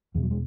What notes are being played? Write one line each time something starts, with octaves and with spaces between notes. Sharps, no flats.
E2 B2 E3
F#3
G#3